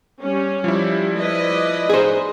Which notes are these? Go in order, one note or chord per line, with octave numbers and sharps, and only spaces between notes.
G3 C#4
F3 G3 E4
B4 D5 D#5
G#4 C5